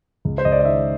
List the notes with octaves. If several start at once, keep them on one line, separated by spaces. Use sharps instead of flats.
C#2
C5
C#2 D#5
D5
D#5
D#3 E5